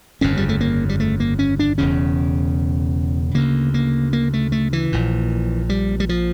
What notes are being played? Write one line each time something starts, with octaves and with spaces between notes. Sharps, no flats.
G1 F2 C#3 C#4
G3
A3
A#3
G3
A3
A#3
C#4
D4
E1 E2 C#3 C#4
D2 C#3 A#3
A#3
A#3
A3
A3
E3
A#1 A#2
G3
G3
F3